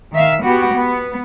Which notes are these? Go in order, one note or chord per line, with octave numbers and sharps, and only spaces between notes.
D#3 E5 F5
B3 F#4 G4
B3